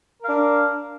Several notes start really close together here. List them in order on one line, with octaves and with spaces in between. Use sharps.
A#4 F5 D4